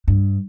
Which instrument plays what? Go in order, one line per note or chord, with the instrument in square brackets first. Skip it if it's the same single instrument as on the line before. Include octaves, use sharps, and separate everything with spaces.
[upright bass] G2